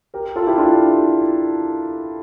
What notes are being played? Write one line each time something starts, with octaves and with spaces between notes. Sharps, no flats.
G4 A#4
F4 A4
E4 G4
D4 F4